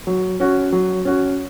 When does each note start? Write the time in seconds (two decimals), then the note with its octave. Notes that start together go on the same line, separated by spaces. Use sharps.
0.07 F#3
0.40 C#4 F#4
0.72 F#3
1.05 C#4 F#4